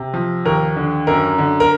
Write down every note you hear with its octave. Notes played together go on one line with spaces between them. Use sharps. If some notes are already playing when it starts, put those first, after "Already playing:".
Already playing: C3
F3
D#2 A#4
D3
F#2 A#4
D3
A#4